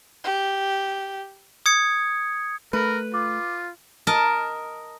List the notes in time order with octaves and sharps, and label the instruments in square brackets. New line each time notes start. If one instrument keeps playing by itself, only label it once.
[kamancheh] G4
[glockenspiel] D#6 G#6 C#7
[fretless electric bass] A3 [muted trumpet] A#4 [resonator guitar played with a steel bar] B4
[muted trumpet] F4 [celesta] D6
[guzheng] A#4 D#5 A5